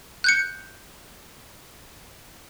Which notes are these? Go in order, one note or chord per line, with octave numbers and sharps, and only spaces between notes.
F#6 G6 C#7